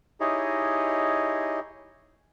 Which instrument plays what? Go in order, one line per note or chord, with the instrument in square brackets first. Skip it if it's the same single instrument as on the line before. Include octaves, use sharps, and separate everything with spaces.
[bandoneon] D#4 E4 G4 G#4 C#5 D#5